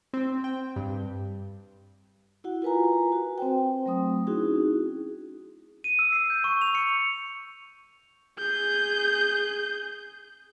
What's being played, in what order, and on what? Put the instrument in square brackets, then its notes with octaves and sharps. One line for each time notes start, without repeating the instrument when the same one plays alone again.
[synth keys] C4
G5
G2
[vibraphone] E4 F#4 F#5
F4 A#4 B4 G#5 A#5
F#4
C4 C5 G5
F#3 A3 C4 D#6
C#4 D#4 E4 F#4 G#4
[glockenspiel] D#7
E6
C7
G6
C#6
F7
C#7
[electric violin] G#4 G6